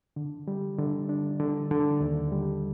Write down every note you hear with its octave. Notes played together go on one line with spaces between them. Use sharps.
D3
G3
D3
D4
D3
D3
D#2
G3